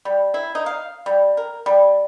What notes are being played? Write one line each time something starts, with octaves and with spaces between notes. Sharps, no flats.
G3
E4
D#4
F5
G3
A#4
G3